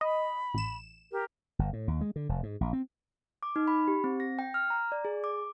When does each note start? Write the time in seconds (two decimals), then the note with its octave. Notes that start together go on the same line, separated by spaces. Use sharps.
0.01 D#5 B5
0.54 A1 E7
1.11 G4 A#4
1.59 G1
1.73 A2
1.88 D#2
2.01 G#3
2.16 D3
2.29 F1
2.43 G#2
2.61 A#1
2.73 C4
3.43 D6
3.56 D#4
3.68 B5
3.88 G4
4.04 C4
4.20 A#6
4.39 G5
4.54 F6
4.70 A#5
4.92 D5
5.05 G#4
5.24 D6